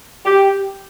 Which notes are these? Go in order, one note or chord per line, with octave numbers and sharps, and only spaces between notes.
G4